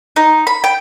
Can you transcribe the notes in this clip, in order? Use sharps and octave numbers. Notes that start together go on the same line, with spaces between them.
D#4
B5
G5